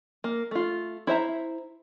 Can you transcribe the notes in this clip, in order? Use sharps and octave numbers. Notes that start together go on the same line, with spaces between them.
A#3
A3 F4
E4 C5 E5 A#5